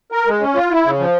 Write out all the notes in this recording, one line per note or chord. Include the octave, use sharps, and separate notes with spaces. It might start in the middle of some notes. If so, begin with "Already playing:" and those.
A#4
G#3
C#4
F4
E4
C#3
F3